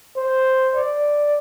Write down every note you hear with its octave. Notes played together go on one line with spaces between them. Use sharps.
C5
D5